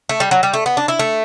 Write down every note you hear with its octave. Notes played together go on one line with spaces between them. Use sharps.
A3
G3
F#3
G3
A3
B3
D4
E4
A3